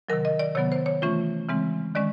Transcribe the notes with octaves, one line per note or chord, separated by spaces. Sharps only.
C3 D#3 F#3 A#4
D#5
D5
C3 D#3 F#3 B3 C#5
C5
C#5
E3 A3 C#4 F4
C#3 E3 G#3 C4
D#3 G#3 C#4 D5